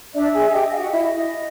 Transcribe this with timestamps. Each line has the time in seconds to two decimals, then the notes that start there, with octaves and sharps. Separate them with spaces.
0.14 D4 D5 E5
0.33 G#4 G#5
0.53 G4 D#5 G5
0.71 D#5 F5
0.78 F#4 F#5
0.91 E4 E5